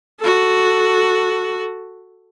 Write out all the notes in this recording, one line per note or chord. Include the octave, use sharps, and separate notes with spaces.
F#4 A4